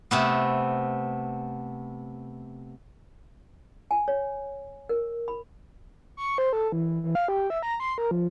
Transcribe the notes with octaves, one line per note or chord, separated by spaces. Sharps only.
C3 A3 B3
G#5
C#5
A#4
B5
C#6
C5
A4
E3
E3
F5
G4
E5
A#5
C6
A#4
F3